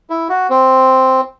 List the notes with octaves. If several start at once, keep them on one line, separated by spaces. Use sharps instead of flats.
E4
F#4
C4